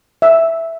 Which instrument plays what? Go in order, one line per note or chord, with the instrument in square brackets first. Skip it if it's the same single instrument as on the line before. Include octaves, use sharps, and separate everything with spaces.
[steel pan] E5